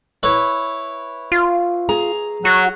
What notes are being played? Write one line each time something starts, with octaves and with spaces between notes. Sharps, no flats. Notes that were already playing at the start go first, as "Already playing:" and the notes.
E4 B4 C#5
F4
G#4 A#5
F#3 F#4